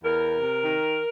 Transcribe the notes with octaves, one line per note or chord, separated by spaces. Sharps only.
E2 A#4
C3
D#3